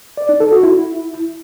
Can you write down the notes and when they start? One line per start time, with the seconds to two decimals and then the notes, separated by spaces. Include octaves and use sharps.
0.17 D5
0.29 D#4
0.40 A4
0.52 F#4
0.63 E4